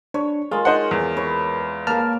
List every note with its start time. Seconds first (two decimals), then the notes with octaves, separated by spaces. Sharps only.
0.14 D4 C#5
0.51 G#3 F4 G#4 A#4
0.65 D#4 C5 F#5
0.91 E2
1.17 B4 C#5
1.87 A#3 A#4 A5 F6